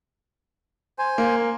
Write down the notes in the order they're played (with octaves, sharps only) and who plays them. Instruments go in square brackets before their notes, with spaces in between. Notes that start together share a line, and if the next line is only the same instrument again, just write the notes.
[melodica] C5 G#5
[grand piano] A#3